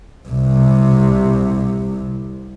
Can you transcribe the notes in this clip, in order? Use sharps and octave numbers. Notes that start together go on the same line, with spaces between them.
C2 C3